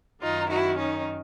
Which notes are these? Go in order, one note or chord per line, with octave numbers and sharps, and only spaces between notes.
F#2 D#3 D#4 F4
E4 F#4
C#4 D#4